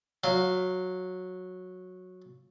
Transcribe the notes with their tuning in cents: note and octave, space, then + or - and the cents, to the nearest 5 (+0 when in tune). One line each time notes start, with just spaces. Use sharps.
F#3 -10 F5 +0